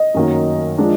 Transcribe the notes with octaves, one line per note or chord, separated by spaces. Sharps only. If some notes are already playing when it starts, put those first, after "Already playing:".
Already playing: D#5
F#2 D#3 F#3 A#3
F3 G#3 D4